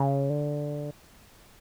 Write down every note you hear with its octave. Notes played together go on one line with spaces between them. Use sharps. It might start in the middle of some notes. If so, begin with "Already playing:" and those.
Already playing: C#3
D3